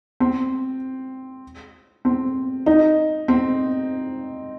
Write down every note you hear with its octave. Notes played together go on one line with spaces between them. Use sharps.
C4
C4
D#4
C4